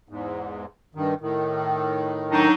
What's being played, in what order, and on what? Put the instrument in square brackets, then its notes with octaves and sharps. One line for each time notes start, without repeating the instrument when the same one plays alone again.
[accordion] E2 G#2
G2 D#3
A2 D#3
[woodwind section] F#3 D4 D#4